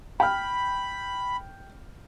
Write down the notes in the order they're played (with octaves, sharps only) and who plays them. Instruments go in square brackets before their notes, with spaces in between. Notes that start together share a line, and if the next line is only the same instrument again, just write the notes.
[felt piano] G5 F6 [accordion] B5